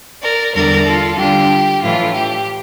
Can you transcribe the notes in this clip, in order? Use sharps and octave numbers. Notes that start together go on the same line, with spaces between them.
A#4 D5
E2 D3 G3 D4 A#4 D5
F4 A4
D3 G3 D4 F4 G4
A2 E3 A3 D4 F4
G4